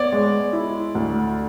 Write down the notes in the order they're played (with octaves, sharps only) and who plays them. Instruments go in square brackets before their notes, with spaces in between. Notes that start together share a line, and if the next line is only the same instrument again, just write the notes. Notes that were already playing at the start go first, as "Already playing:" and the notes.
Already playing: [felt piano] B3 [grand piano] C#5 D5
[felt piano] G#3
E4
D2